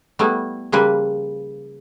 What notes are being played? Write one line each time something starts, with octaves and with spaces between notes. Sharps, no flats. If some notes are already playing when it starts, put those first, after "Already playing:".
G3 A3 B3 E4
C#3 F3 G3 A#3 F4 B4